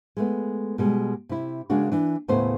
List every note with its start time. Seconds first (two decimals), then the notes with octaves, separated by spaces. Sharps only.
0.17 G#3 A3 B3
0.78 B2 G3 G#3
1.29 C3 E4
1.70 C#3 G#3 A#3 D4 F#4
1.92 E3 D4
2.28 D#2 A2 C#3 A3 B3 C5